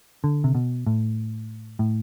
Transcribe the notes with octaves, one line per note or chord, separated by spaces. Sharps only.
D3
C3
B2
A2
A2